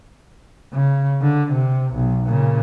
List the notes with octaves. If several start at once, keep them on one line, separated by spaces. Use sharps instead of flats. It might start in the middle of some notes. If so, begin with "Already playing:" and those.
C#3
D3
C3
B1
A#2 C#3